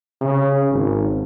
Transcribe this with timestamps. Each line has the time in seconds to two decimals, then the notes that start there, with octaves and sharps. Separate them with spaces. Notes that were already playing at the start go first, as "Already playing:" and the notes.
0.22 C#3
0.71 G#1